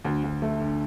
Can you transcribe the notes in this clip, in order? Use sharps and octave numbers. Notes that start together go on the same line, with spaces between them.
D2
D2
A3
D3